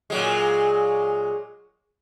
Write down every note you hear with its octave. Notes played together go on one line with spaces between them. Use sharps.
A#2 F#3 G#3